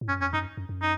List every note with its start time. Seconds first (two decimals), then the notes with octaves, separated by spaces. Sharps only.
0.01 A2
0.08 F#2 C#4
0.21 F2 C#4
0.33 F#2 D#4
0.57 F#2
0.69 F#2
0.82 D#4